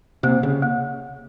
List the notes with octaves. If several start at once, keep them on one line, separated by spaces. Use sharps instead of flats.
C3 A#3
C#3
A#3